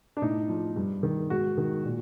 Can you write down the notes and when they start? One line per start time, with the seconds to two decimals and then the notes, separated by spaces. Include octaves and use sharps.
0.17 D4
0.22 A2 D#4
0.49 F3
0.76 G2
1.03 D#3
1.30 G#2 F#4
1.57 D#3
1.85 A#2